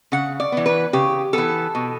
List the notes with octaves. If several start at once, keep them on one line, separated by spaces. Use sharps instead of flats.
C#3 F#5
D5
E3 B3
B4
C#3 G4
E3 B3 A4
B2